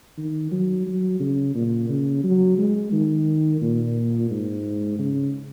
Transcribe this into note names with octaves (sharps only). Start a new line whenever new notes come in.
D#3
F#3
F#3
C#3
A#2
C#3
F#3
G#3
D#3
A#2
G#2
C#3